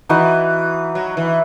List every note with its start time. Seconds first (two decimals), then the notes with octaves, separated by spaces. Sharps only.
0.09 E3 D#4 F#4 B4
0.95 F#3
1.17 E3